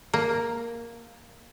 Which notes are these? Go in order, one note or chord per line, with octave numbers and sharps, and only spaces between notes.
A#3